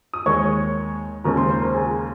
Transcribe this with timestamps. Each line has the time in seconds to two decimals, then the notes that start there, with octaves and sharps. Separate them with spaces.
0.14 D#6
0.26 D#2 D#3 G#3 C#5 C#6
1.24 D#2 C#3 G#3 C#4 A#4 A#5
1.37 C5 C6
1.49 C5 C6
1.61 A#4 A#5
1.74 G#4 G#5